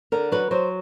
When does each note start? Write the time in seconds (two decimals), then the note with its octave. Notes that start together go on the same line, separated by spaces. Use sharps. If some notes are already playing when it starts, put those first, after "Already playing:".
0.12 D3 A#4
0.32 F#3 B4
0.51 F#3 C5